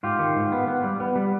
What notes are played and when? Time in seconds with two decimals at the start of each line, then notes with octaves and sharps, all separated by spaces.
0.03 G#2 F4 G4
0.19 D#3
0.36 G#2
0.52 B3
0.68 B3
0.84 G3
1.00 B3
1.16 G3